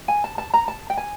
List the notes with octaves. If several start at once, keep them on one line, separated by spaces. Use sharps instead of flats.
G#5
A5
A5
A#5
A5
G5
G#5